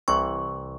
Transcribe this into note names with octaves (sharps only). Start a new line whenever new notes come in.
C2 C3 E3 C#6